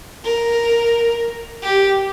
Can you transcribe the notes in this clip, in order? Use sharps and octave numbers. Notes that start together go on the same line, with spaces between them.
A#4
G4